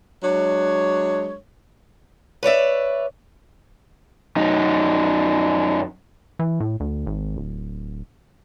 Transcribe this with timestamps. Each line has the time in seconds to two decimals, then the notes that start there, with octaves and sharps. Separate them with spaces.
0.23 F#3 G#3 D4 C#5
2.43 B4 C#5 D5 E5
4.37 F#2 D#4
6.39 E3
6.60 A2
6.80 D2
7.06 G#1
7.37 D1